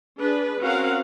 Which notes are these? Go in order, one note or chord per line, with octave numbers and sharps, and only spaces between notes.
D4 G#4 B4
C4 C#4 F#4 A#4 F5 F#5